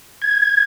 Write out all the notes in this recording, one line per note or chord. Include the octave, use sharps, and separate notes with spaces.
G#6